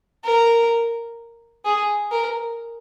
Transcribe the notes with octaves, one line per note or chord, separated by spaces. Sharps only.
A#4
G#4
A#4